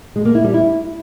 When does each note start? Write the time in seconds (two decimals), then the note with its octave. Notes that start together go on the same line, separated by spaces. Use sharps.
0.16 G#3
0.25 A#3
0.35 E4
0.44 G3
0.54 E4